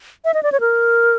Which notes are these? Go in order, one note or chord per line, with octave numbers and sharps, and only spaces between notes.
E5
D#5
D5
C#5
A#4